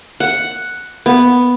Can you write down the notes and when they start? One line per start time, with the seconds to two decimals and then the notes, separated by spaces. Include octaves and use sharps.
0.20 F#5
1.06 B3